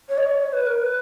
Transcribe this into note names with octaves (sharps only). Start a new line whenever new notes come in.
C#5
D#5
C#5
C#5
B4
A#4
B4